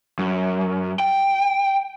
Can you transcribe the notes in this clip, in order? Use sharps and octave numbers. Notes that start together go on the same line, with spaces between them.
F#2
G5